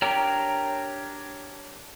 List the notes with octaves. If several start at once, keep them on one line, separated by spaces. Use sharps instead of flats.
D4 G4 A#4 C#5 G5 A#5